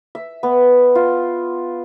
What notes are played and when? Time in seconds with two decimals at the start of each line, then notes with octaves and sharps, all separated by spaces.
0.15 E5
0.43 B3
0.95 F4